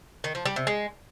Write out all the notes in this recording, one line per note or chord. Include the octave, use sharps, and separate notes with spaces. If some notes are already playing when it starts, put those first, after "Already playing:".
D#3
F3
G3
C3
G#3